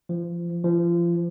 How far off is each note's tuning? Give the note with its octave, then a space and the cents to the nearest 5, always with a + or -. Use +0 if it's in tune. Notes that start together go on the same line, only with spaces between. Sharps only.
F3 -25
F3 -30